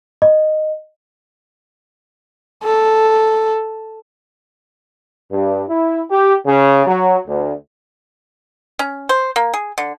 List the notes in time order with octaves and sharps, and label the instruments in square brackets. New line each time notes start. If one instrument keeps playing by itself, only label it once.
[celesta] D#5
[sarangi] A4
[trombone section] G2
E4
G4
C#3
F#3
D2
[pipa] C#4
C5
A#3
G#4
D3